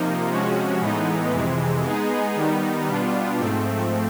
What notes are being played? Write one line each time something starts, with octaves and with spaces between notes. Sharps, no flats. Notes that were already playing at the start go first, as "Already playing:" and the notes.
Already playing: C3 F3 A#3 D#4
C3 F3 G#3 C#4 F#4
A2 E3 G#3 B3 D#4
F2 C3 E3 G#3
G#3 B3 D#4 G#4
D#3 G3 B3 D#4
B2 G3 B3 D4 F4
G#2 F3 A3 C4